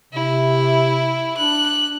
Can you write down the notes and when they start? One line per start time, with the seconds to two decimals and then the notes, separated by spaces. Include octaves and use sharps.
0.13 C3 E4
1.37 D4 F#6